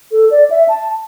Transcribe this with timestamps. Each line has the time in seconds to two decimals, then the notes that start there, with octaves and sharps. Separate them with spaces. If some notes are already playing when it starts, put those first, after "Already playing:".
0.12 A4
0.31 D5
0.50 E5
0.69 A5